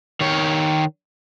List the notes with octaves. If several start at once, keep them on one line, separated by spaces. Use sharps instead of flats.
D#3 C#5